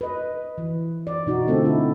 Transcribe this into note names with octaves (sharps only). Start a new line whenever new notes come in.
B4 D#5
E3
D5
B2 D#4 F#4
D3 A3 C4 F4 A4
E4